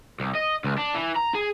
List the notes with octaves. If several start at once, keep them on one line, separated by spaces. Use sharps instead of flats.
C2
D#5
C#2
D4
E3
A#5
G#4